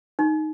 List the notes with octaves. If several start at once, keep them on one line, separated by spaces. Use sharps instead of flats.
D#4